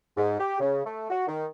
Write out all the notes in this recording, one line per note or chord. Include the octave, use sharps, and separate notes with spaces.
G#2
G4
C#3
A3
F#4
D#3